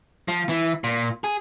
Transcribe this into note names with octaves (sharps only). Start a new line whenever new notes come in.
F3
E3
A#2
G#4